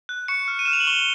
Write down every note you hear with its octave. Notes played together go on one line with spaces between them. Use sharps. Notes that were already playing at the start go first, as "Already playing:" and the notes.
F#6
C#6 C#7
F6
D#7
F6 E7
F7
F#7
C#6 G7